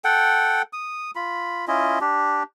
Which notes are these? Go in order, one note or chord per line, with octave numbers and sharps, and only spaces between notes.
A4 F#5 G5
D#6
F4 B5
C#4 E4 F4 D#5
D4 G4